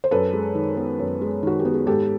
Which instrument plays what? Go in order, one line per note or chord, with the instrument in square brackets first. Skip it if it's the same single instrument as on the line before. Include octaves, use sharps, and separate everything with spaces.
[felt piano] C5
F#2 A4 B4
G#3
D#3
B3
F#2
G#3
D#3 F#4
G4
B3
G#4
G#2 G4 A4